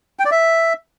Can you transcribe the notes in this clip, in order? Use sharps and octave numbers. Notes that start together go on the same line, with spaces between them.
G5
D5
E5